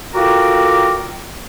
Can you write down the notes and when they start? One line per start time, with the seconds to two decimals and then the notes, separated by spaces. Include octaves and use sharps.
0.14 F4 F#4 A4 A#4 D5 G5